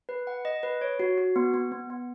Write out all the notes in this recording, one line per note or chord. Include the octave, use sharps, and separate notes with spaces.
B4
F#5
D#5
B4
C#5
F#4
F#4
B3
B3
B3
B3